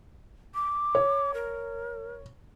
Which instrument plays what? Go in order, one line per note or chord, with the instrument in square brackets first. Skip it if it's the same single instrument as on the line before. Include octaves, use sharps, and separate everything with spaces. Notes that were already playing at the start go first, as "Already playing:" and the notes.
[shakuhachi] D6
[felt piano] C#5
[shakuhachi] A#4